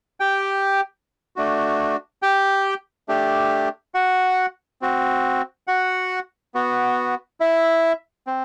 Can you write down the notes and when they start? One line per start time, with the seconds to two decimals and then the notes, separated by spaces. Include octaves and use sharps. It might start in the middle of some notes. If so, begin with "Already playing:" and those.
0.20 G4 G5
1.36 A3 D4 F#4
2.22 G4 G5
3.08 A3 D4 G4
3.94 F#4 F#5
4.81 C4 F#4
5.67 F#4 F#5
6.54 B3 F#4
7.40 E4 E5
8.27 C4